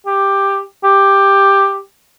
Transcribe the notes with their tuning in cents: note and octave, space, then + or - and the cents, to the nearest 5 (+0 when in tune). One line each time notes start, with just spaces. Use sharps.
G4 +10
G4 +10